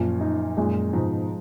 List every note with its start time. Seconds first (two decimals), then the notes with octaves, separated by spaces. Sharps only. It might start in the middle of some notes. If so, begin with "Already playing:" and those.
Already playing: F#2 A#2 F3
0.21 D#4
0.57 F#2 A#2 G#3
0.93 G#2 B2 F3